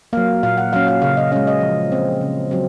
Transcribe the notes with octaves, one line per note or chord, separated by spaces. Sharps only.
F#3 A#3 F5
A#2 F5
F#5
F#3 C#4 F5
F5
C#3 F5
D#5
G#3 C#4 F5
D#5
F3
C4
C#3
F#3 C4